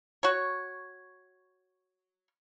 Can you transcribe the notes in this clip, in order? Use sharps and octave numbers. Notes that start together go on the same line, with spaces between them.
F#4 C#5